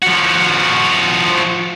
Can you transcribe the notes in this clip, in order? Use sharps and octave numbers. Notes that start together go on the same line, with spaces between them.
F3 F#4